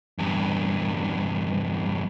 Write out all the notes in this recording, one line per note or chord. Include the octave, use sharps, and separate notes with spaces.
E2 G2